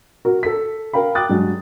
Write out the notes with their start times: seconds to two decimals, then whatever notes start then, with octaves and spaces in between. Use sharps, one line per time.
0.25 F#4 A#4
0.43 A4 B6
0.93 A#4 F5 G5 B5
1.15 G5 D6 D#6 F#6 A6
1.29 G2 F#3 G#3